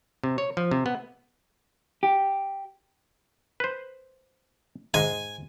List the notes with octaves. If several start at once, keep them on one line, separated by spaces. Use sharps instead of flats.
C3
C#5
F3
C3
B3
G4
B4 C5
G#2 G#3 G#5